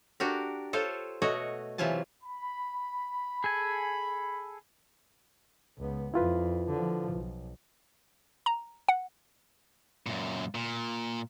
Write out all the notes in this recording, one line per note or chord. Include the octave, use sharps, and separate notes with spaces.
D4 F#4 G4 A#4
F4 A4 C5 C#5 F5
B2 A3 F#4 C#5 D#5
C3 E3 F#3 F4 G#5 A5
B5
G#4 A4 G#5
C#2 B3
F2 E4 F4 B4
D3 F3
B1
A#5
F#5
F#2 A#2
A#2